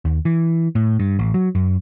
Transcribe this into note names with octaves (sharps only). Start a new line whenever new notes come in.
D#2
E3
A2
G2
A1
F#3
F#2